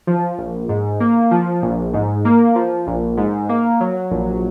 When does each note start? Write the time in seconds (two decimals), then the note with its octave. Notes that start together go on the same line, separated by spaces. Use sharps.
0.07 F3
0.38 A#1
0.69 G#2
1.00 A#3
1.31 F3
1.62 A#1
1.93 G#2
2.25 A#3
2.55 F3
2.87 A#1
3.17 G#2
3.49 A#3
3.80 F#3
4.11 A#1